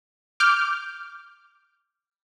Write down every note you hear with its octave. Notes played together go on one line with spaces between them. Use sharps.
D6 F6 G6